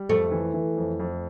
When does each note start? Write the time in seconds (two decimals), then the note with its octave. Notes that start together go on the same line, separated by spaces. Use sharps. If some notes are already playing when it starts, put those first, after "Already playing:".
Already playing: G3
0.09 F2 A3
0.31 E3
0.54 E3
0.77 F2
0.99 F2